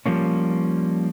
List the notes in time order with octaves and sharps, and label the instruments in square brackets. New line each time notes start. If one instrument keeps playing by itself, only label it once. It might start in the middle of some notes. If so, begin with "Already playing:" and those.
[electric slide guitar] F3 G3 A#3 C#4